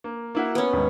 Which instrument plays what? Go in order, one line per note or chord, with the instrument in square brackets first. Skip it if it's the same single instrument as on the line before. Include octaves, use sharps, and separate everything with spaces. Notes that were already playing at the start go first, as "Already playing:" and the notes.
[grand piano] A#3
A#3 E4 F#4
[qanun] B3 C#4
[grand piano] D#2 G#2